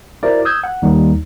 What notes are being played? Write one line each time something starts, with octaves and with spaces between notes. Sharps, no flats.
E4 F#4 A#4 C5 D5 E5
D#6 E6 G6 G#6
F#5
D#2 G3 D#4